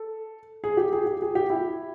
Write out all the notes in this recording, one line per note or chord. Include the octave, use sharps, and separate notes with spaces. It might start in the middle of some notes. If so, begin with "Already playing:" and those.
Already playing: A4
G#4
G4
G#4
G4
G#4
G4
E4